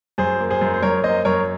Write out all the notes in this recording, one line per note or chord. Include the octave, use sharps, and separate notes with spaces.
F#2 G#4 C5
A#3
G#4 C5
F#2
C5
F#2 A#4 C#5
A#3 C5 D#5
F#2 A#4 C#5